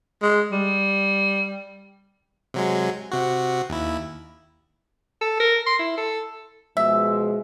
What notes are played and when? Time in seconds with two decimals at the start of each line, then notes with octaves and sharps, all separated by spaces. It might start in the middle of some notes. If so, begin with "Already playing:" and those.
0.22 G#3
0.52 G3
2.54 C3 F#3 G#3
3.12 C3 F#4
3.70 D#2 E4
5.21 A4
5.40 A#4
5.66 C6
5.79 E4
5.97 A4
6.77 B2 F3 G#3 E5